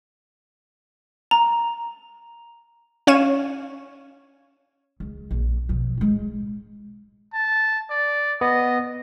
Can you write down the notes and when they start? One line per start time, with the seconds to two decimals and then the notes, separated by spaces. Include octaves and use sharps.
1.31 A#5
3.07 C#4 C#5 F5 G#6 D#7 E7
5.00 C#2
5.31 A#1
5.69 B2 F3
5.97 A2 G#3
7.33 A5
7.90 D5
8.41 B3 D#5